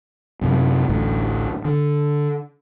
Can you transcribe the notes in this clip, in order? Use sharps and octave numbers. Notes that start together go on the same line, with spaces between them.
F#2 C3 F#3
A1 D2 A2 A3
D3